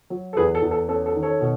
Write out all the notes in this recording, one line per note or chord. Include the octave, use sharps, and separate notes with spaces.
F#3
A4
E2 G#4 B4
A4
E2
A4
C#4 A4
A4
D#3
A4 C#5
B2